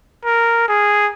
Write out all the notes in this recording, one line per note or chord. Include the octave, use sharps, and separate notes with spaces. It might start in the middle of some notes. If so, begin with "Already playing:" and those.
A#4
G#4